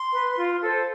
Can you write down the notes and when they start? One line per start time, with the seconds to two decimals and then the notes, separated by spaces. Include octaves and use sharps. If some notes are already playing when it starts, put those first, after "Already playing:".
Already playing: C6
0.12 B4
0.36 F4
0.61 A4 C5